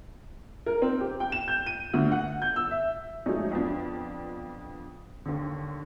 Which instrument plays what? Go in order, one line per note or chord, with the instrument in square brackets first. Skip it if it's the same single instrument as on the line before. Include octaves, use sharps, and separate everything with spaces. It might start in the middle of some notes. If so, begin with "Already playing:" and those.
[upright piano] A#4
C4
G4
G5
E7
G6
D#7
D2
F#5
G6
E6
E5
[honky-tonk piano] F3 F#3 G#3 A3 C#4 D#4
F2 F3 B3 D4 F4
D#2 D3